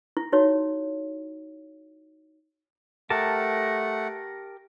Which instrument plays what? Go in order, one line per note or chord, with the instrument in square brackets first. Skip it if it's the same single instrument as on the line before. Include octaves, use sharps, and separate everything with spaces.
[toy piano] E4
D#4 F#4 C#5
[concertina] A3 F#5 [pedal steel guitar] G4 A#4 A5